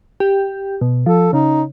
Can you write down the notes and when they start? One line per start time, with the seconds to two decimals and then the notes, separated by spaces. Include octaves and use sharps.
0.20 G4
0.81 B2
1.06 F3 A4
1.33 C#3 D#4